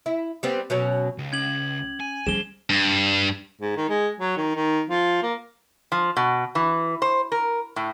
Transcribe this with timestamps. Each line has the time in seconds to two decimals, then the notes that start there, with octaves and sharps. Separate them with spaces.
0.06 E4
0.43 G3 B3 C4
0.70 B2 F#3 C#4
1.18 C#2
1.33 C#4 G#6 F#7
2.00 G#5
2.27 F3 G3 C#4 G#4 E7 G7
2.70 G2
3.61 G#2
3.77 D#3
3.89 G#3
4.20 F#3
4.37 D#3
4.55 D#3
4.90 F3
5.23 A#3
5.92 F3
6.17 B2
6.55 E3
7.02 C5
7.32 A#4
7.76 A2